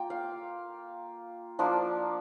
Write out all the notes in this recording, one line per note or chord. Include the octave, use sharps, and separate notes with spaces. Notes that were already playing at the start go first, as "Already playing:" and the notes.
Already playing: A#3 F4 G5
F5
F3 A#3 D4 F4